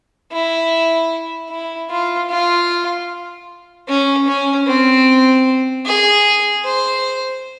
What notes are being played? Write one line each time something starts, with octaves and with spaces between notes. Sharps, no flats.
E4
E4
F4
F4
C#4
C#4
C4
G#4
C5